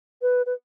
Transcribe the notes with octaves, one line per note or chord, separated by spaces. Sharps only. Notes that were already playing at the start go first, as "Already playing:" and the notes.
B4
B4